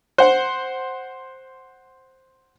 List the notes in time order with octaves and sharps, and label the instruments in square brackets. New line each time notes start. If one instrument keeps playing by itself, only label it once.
[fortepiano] C5 F#5